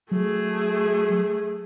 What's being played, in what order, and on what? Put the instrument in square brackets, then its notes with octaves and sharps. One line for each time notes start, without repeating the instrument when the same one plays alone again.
[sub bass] F#3 [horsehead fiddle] A3 G#4